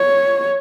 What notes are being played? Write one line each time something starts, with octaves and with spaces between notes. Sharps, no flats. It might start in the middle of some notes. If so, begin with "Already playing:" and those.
Already playing: C#5